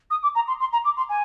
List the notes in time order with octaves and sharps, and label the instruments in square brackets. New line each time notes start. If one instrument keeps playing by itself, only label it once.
[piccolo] D#6
D6
A#5
C6
C6
A#5
D6
C6
G#5